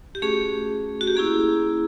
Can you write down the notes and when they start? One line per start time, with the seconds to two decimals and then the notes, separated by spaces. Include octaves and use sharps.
0.15 G4
0.22 A3 C#4 F#4 G#4
1.01 F#4
1.08 G4
1.16 A#3 C#4 E4 G#4